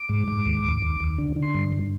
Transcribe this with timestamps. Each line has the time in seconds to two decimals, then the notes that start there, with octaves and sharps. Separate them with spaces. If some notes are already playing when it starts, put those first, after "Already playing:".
Already playing: D6
0.09 G#2
0.28 G#2
0.46 D#2
0.64 D#2
0.82 D#2
1.00 D#2
1.18 D3
1.36 D3
1.43 C6
1.54 G2
1.72 G2